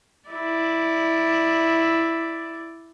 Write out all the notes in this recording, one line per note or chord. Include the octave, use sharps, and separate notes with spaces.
E4 D5